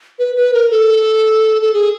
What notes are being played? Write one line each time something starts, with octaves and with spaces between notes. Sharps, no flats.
B4
B4
A#4
A4
A4
G#4